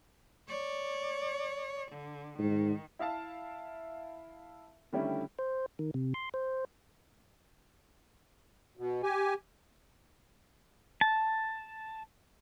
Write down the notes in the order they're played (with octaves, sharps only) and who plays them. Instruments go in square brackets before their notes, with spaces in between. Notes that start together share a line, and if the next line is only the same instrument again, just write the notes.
[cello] C#5 D5
D3
[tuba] G#2 [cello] D#3
[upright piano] E4 E5 F5 A5
D3 D#3 G3 A3 C#4 E4
[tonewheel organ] C5
D#3
C3
C6
C5
[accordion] B2
G4 G#5
[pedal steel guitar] A5